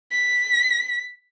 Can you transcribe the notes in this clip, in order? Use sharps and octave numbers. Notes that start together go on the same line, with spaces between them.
B6